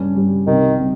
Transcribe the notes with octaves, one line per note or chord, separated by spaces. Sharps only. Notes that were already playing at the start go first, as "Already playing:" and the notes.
Already playing: G2 G3 C#4
G2 G3 C#4
C2 C3 D#3 G3
C3 G3